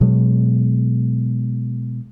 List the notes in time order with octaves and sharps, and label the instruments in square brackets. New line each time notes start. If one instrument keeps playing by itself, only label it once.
[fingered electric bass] B2 F#3 G#3